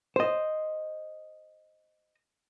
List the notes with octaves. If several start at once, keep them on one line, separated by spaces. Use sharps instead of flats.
C5 D#5